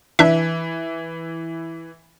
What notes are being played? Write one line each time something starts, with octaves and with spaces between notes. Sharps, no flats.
E3 D4 E5